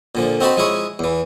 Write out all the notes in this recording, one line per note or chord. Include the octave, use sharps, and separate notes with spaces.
A#2 D3 F3
C4 D#4 F#4 C5 A5 B5
F3 G#3 E4 G#4 C#5
E2 E3